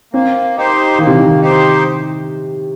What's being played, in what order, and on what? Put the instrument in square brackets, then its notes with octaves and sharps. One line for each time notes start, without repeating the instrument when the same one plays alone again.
[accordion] A#3 [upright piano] C4
[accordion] D#4 G4 C5
[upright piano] D#3 [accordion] A#3
[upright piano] C3
D#3
[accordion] D#4 G4 C5